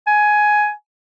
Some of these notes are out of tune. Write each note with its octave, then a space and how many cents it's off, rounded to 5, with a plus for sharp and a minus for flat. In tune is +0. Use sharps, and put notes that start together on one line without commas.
G#5 +10